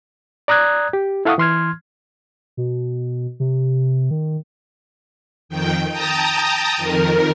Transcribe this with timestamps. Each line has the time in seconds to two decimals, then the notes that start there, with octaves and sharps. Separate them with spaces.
0.48 D5 A#5 D#6 F#6 G#6
0.93 G4
1.25 E4 A4 F5 F#5 C#6 D#6
1.38 E3 C6 F6 G#6
2.57 B2
3.40 C3
4.11 D#3
5.49 F2 D#3 G5
5.90 G5 A5 A#5 D#6
6.77 F2 D#3 A#4